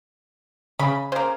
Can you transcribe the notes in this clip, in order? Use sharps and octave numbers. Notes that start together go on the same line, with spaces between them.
C#3 B5
C#3 A#3 C5